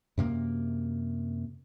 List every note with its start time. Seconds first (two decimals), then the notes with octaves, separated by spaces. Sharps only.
0.18 F#2 C3 A#3